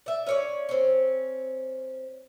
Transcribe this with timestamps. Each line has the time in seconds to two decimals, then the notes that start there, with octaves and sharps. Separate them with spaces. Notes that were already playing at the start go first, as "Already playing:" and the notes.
0.06 D5 E5
0.27 C#4 C#5 D5
0.69 C4 C#4